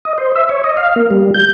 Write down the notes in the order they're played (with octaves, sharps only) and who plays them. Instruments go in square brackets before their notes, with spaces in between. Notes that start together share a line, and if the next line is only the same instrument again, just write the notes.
[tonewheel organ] D#5
C5
E5
C#5
D#5
F5
A#3
G3
G6